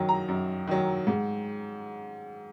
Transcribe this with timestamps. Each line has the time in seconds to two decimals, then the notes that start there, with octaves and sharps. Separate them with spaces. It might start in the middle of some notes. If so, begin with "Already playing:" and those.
Already playing: F#2 D#3 F#3
0.09 A#5
0.28 F#2
0.68 D#3 F#3
1.07 G#2